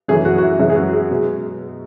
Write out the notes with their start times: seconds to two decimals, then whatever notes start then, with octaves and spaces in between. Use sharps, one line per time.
0.08 F#2 E3 A3 C#4 G#4
0.25 F#4
0.38 F#4
0.43 E4
0.59 F#2 E3 G#3 C#4 E4
0.70 G#4
0.76 F#4
0.93 G#4
1.11 B2 G#3